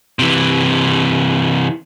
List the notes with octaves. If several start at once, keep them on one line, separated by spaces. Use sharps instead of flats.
C3 E3